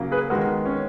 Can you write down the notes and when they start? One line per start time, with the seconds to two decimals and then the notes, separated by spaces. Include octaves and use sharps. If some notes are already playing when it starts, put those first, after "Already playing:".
Already playing: C#3 F#3 A#3
0.12 G#4 B4
0.30 D#3 G#3 B3 F#4 A#4
0.65 C#4